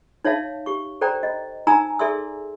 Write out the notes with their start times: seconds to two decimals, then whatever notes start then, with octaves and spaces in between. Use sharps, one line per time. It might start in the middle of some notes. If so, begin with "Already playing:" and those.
0.25 D#4 C#5 E5 F5 A5
0.66 G4 C#6
1.01 A4 C5 D5 G5 A#5
1.23 D#5
1.67 D#4 G#5 A#5 E6
1.99 G#4 A4 D5 E5 C6 E6